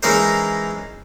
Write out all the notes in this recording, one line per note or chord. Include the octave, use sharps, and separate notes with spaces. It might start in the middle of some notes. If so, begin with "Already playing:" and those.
E3 G#3 C#4 D#4 A#4 C5